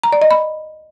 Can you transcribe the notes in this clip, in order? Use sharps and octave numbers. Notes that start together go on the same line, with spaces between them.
A#5
D5
D#5
B5